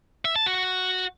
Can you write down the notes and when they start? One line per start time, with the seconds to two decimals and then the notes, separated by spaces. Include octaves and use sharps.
0.25 E5
0.36 A5
0.46 F#4